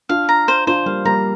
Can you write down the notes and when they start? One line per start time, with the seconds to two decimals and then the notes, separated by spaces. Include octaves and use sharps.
0.09 D4 F4 F5
0.29 A#5
0.48 C5
0.67 D4 F4 C5
0.86 G3 A#3 F5
1.05 G3 A#3 A#5